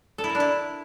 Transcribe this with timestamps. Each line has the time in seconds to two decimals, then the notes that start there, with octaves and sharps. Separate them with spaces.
0.18 A4
0.24 E4
0.29 A#4
0.35 D4
0.40 E4